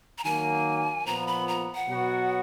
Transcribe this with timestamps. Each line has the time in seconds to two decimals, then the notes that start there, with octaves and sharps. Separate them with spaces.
0.18 A#5
0.23 D#3 F#3 A#3 G#5
1.05 A#2 F3 B3 A#5
1.27 B5
1.48 A#5
1.75 F#5
1.88 B2 F#3 B3 F#4